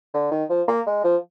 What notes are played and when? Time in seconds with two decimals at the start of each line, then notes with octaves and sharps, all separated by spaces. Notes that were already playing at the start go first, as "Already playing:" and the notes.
0.14 D3
0.31 D#3
0.50 F3
0.68 A#3
0.87 G#3
1.04 F3